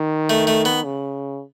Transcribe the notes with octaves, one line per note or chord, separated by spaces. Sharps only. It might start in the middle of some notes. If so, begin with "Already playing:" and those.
Already playing: D#3
A3
A3
B3
C#3